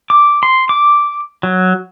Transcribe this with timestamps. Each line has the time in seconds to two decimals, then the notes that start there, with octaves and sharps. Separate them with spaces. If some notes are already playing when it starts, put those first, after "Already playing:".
0.10 D6
0.43 C6
0.69 D6
1.43 F#3